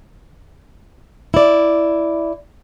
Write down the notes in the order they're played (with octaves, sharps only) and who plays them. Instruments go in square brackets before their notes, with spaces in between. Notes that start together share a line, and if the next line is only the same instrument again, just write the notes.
[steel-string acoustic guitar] E4 D5